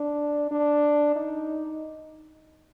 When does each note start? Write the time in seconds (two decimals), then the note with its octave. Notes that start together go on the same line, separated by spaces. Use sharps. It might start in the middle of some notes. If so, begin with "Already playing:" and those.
Already playing: D4
0.51 D4
1.16 D#4